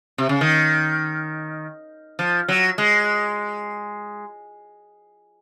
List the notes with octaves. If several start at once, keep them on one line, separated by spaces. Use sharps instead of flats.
C3
C#3
D#3
F3
F#3
G#3